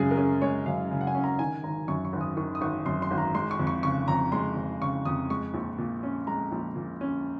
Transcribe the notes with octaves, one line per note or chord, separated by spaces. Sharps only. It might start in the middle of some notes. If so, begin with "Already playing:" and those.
Already playing: F#2 C#3 G#3 G#4
A#4
C#4 G#4
G#3 C#5
F#2 F5
C#3
F#5
G#5
C#4
A#5
D#3 G#5
G#1 A#5
F#2 C#6
C#6
G#1
D#6
D#3 C#6
D#6
G#1 C#6
F#2 C6
C6
G#1
A#5
G#3 C6
C#6
F2
C#6
C#3 C#6
F2 A#5
G#3 C6
F2
C#3 C#6
F2 D#6
G#3 C#6
A#1
A#2
C#4
G#3 A#5
A#1
A#2
C#4